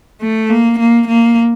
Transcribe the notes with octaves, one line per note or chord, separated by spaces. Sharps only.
A3
A#3
A#3
A#3